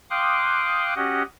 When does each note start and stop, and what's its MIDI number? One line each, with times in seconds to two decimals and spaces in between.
0.10 0.94 77
0.10 0.94 79
0.10 0.94 84
0.10 0.94 86
0.10 0.94 87
0.10 0.94 90
0.96 1.23 61
0.96 1.23 66
0.96 1.23 67
0.96 1.23 75
0.96 1.23 78